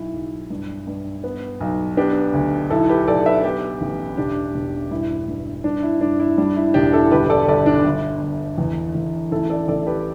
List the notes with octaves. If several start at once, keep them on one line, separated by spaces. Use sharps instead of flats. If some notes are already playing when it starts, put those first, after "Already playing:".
Already playing: B1 E4
B1
G2
G2
B3
B1
B3 D4 G4
D2
B1 E4 A4
G4 B4
B1 A4 D5
B4 E5
B3 G4 B4
A1
E1 D4 G4
E1
G2 E4
G2
G2 D4
E4
G2 D4
E4
G3 D4
E4
E1 D4 G4
E4 A4
G1 G4 B4
A4 D5
G1 A4 D5
D4
G1
G1
E2
E2
A1 E4 A4
A4 D5
A1 A4 D5
G4 B4